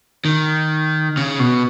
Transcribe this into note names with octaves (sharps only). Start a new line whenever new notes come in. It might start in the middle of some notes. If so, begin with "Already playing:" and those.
D#3
C#3
B2